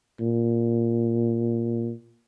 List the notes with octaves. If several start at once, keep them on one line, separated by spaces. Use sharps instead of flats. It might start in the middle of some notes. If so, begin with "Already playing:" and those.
A#2